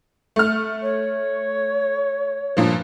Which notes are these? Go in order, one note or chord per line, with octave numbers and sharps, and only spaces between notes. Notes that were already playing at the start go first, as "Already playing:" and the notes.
A3 F6
C#5
G2 A#2 F3